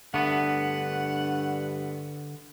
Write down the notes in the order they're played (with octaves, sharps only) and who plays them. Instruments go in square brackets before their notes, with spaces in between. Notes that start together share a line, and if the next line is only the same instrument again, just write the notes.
[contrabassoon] G2 [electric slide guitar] D3 [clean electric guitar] A3 B3 [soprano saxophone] F#5